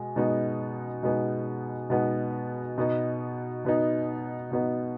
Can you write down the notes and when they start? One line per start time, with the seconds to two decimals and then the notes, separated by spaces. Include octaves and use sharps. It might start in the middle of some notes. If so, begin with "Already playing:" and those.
Already playing: B2 G#3
0.16 B2 G#3 B3 D#4
1.03 B2 G#3 B3 D#4
1.90 B2 G#3 B3 D#4
2.78 B2 B3 D#4
3.65 B2 B3 D#4
4.51 B2 B3 D#4